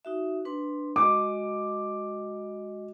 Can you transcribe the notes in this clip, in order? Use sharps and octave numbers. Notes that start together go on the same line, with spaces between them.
D#4 F#4 E5
D4 B4 C6
G#3 F#4 D#5 D6